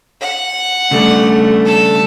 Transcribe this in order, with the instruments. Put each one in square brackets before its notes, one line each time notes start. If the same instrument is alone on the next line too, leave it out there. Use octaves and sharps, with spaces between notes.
[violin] F#5
[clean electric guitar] C#3 G3 D4 [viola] A3
[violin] A4 A5